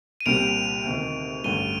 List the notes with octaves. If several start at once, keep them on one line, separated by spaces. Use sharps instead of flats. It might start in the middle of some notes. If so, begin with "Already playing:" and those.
D#7
C2 A#2 G3 C4 G4 D7 F7
D2 C3 D#3
A1 G2 D3 G3 D#7 G7